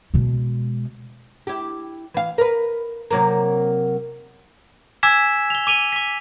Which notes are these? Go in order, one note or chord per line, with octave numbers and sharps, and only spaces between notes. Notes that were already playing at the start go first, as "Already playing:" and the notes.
B2 G#3
E4 G4
E3 F5
A#4 B4
C3 F#3 A#3
G#5 D6 E6 G#6 B6 E7
F7 G7
D6 D#7 F7 G7
D6 B6